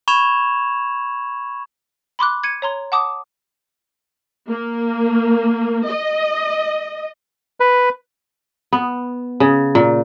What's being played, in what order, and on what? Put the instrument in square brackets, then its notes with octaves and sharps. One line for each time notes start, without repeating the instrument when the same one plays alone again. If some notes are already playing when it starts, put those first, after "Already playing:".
[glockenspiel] B5 C#6 G#6 E7 F7
[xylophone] B5 C6 D6 F#6
G#6 C#7 D#7
C#5 A#5 C6
F#5 A5 D6 D#6
[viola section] A#3
D#5
[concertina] B4
[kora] B3
C#3
A#2